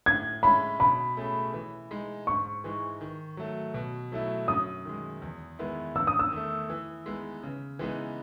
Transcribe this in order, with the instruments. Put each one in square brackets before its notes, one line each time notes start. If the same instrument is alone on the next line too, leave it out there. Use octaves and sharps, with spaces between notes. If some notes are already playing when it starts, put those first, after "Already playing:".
[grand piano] A2 [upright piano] G#6
[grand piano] G#3 C#4 E4 [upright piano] B5
[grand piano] B2 [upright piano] B5
[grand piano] A3 C#4 G#4
E3
G#3 D#4
[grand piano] G#2 [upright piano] C#6
[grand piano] E3 G#3 D#4
D#3
F#3 A3
B2
F#3 A3 E4
[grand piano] F#2 [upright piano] D#6
[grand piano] D#3 G#3
E2
D#3 G#3 B3 E4
[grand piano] E2 [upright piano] E6
[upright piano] D#6
E6
[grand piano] D#3 A3
E3
G#3 B3 D#4
C#3
E3 G#3 B3 D#4